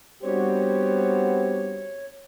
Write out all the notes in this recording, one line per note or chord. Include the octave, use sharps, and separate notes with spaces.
G3 B3 C4 D4 F#4 G4 C#5